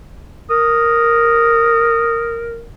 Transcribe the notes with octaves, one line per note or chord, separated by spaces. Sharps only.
A#4 D#6